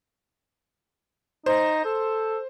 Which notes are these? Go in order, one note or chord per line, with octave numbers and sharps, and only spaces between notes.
D#4 C5
A4